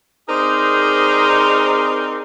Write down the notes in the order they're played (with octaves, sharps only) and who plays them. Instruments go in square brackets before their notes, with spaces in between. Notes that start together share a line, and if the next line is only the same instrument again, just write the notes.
[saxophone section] C4 D#4 G#4 A#4 C5 D5